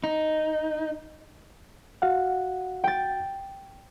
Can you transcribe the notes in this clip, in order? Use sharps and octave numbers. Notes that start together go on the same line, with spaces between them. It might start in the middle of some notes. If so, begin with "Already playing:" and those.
D#4
F#4 F5 F#5
G5 A6